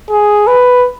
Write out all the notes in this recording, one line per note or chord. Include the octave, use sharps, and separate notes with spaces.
G#4
B4